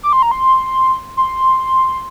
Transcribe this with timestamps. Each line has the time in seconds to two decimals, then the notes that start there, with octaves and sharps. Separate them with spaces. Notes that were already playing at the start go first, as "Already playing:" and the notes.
0.03 D6
0.13 C6
0.22 A#5
0.31 C6
1.17 C6